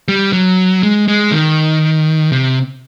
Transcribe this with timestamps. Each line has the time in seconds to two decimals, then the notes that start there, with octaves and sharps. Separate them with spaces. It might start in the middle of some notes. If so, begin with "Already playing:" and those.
0.08 G3
0.33 F#3
0.83 G#3
1.08 G#3
1.32 D#3
2.32 C3